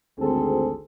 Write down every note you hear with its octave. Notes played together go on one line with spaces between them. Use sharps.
G#1 D2 C4 G#4 A4 C5